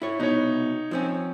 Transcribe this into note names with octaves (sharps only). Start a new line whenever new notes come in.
E4 C#5
C2 B2 B3 D#4 C#5
F3 C4 C#4